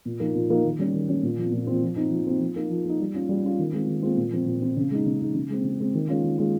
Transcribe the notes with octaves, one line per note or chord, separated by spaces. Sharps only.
A#2
F3 A#3 D#4
A#2
F3 A#3 D#4
D#3
G3 C#4
D#3
G3 C#4
A#2
F3 C4
A#2
F3 C4
F3
C4 D#4
F3
C4 D#4
F3
A#3 D#4
F3
A#3 D#4
G3
C#4 F4
G3
C#4 F4
D#3
G#3 C4 F4
D#3
G#3 C4 F4
A#2
F3 C4
A#2
F3 C4
C#3
G#3 D#4
C#3
G#3 D#4
C#3
G#3 C4
C#3
G#3 C4
D#3
G#3 C#4 F4
D#3
G#3 C#4 F4